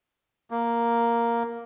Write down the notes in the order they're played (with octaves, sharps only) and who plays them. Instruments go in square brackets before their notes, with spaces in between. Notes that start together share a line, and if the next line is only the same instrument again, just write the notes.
[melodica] A#3